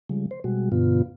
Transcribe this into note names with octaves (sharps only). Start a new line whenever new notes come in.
C#3 F3 G3 G#3
C5
B2 G3 G#3 F#4
G2 B2 D3 B3 F4